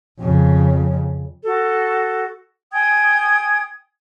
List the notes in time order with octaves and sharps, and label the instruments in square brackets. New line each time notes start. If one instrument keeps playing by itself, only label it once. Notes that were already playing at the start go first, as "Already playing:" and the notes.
[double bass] F2 C#3
[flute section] F#4 A4
G5 G#5 D#6 G#6